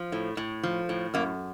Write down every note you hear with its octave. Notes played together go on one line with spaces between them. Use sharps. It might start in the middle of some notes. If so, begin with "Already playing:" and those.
Already playing: F3
A2
A2
F3
A2
F#2 A#3